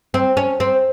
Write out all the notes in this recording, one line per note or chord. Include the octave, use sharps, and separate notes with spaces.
C4
C#4
C4